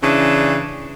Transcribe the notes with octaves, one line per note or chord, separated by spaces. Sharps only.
C#3 E3 D4